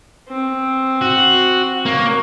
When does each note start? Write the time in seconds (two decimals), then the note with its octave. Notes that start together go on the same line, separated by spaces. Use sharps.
0.29 C4
1.01 F#4
1.86 A#3 C#5